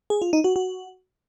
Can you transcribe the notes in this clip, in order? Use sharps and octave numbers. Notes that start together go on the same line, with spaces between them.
G#4
F4
D#4
F#4
F#4